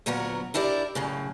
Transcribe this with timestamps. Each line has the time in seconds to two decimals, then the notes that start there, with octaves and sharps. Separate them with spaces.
0.06 D2 A#2 F#3 B3 A#4 F#5
0.54 D4 E4 G4 A#4 D5
0.95 F#2 A2 C#3